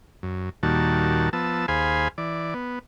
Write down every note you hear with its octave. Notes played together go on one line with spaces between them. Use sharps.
F#2
D#2 A#2 D#3 G3 F#4 A5
F3 B3 A5 E6
D#2 G#4 C5 F5 G#5 B5
E3 D5
B3